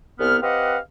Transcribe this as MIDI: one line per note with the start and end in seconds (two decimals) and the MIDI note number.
0.19 0.36 36
0.19 0.36 59
0.19 0.36 89
0.42 0.77 60
0.42 0.77 67
0.42 0.77 71
0.42 0.77 75
0.42 0.77 77
0.42 0.77 78